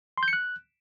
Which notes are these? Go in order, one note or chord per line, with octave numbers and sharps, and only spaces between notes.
C6
G6
C#7
F#6